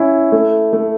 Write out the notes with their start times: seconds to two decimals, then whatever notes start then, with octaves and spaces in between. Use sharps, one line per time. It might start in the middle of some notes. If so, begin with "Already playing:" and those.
Already playing: C#4 E4
0.32 A3
0.73 A3